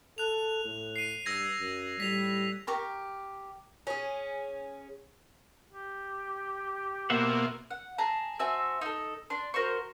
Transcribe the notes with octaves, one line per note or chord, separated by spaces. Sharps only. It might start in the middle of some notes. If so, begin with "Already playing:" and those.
A4 F#6 F7
A2
C7 D#7
G2 E6 G#6 A#6
F#2
A2 G3 B6 F7
G4 A#4 C#6
C#4 G#4
G4
B2 A#3 C5 E5 F#5
F#5
G#4 A5 A#5
C4 F#4 E5 G#5
D#4 A4
D4 C6
F#4 A#4 C5 C#6